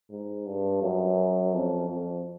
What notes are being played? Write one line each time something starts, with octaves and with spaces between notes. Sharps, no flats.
G#2
G2
F#2
F2
F2